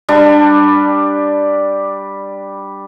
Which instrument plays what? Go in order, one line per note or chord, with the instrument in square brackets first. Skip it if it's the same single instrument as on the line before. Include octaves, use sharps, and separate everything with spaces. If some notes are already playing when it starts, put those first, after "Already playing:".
[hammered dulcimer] G3 D4